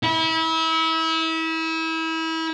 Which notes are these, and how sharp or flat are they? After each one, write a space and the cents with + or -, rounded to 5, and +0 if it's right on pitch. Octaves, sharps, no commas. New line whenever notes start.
E4 -30